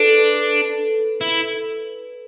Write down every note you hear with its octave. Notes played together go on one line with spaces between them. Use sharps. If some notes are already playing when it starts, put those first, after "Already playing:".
Already playing: D4 A4 B4
E4